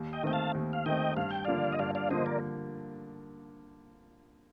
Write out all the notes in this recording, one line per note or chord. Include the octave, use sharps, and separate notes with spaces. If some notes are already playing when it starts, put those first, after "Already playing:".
Already playing: D#2
D#5 G5
D#3 A3 C4 G5
F5 A5
D#2
F5
D#3 A3 C4 D#5 G5
G2 F5
G5
D3 F3 A#3 D5 F5
D#5
G2 D5 F5
D5 F5
D3 F3 A#3 C5 D#5
A#4 D5